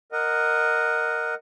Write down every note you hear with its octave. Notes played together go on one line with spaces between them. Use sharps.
A#4 D#5 F#5